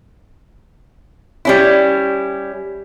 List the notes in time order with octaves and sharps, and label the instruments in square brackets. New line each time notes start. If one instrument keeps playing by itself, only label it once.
[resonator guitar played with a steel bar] G3 C#4 E4